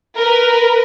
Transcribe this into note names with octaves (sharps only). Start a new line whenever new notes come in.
A#4 B4